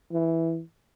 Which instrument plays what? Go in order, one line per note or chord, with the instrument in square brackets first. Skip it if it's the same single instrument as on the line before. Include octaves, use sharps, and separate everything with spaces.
[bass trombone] E3